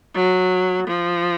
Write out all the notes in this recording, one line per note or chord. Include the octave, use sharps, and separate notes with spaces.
F#3
F3